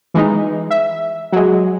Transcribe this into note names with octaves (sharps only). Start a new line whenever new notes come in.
E3 G#3 D#4
E5
F#3 G#3